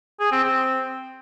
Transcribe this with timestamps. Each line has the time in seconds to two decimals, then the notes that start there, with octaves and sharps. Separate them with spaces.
0.20 G#4
0.32 C4
0.44 C4